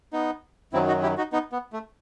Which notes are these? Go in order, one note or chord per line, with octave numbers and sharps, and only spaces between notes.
B3 D#4
F#2 D#3 F#3 C4 E4
D#4 F#4
E4 G4
D#4 F#4
B3 D#4
B3
A3